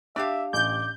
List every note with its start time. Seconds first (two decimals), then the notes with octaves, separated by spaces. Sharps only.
0.16 D4 G4 E5 F5 D6
0.53 A1 D6 G6